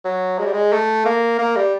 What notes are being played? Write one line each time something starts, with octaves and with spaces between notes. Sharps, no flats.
F#3
G#3
G3
G#3
A3
A#3
A#3
G3